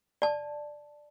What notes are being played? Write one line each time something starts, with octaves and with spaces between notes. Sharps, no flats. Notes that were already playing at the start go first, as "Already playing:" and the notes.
D5 A5